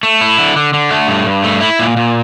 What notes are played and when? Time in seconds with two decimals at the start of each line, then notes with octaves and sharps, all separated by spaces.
0.03 A3
0.21 E4
0.39 D3
0.56 D3
0.74 D3
0.91 A3
1.08 G2
1.26 G2
1.44 A3
1.61 E4
1.79 A#2
1.97 A#2